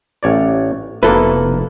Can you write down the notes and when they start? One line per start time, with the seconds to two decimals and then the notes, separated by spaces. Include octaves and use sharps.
0.23 A1 C#5 D5
1.03 F1 B2 A#3 E4 A4 B4